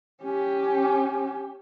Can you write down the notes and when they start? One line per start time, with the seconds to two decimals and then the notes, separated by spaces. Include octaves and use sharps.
0.23 C#4 G4